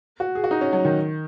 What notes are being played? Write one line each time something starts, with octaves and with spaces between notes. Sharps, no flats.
F#4
G#4
F#4
D#4
C#4
F#3
D#3